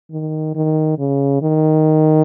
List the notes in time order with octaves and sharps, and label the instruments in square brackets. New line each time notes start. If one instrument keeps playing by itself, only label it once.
[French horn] D#3
D#3
C#3
D#3